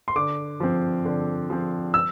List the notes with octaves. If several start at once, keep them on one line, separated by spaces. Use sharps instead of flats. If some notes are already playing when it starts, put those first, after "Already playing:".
C6
D3 D6
F3 C4
D3
F3 C4
E6